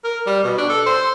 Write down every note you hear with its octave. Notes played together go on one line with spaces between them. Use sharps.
A#4
G3
B2
D4
A4
C5